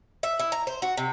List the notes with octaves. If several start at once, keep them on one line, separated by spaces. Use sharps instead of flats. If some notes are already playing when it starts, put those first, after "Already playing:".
E5
E4
A#5
C5
F#4
C3